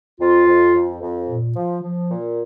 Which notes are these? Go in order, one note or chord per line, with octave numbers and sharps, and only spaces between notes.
F2 F4
F2
F2
F2
A#2
F3
F3
A#2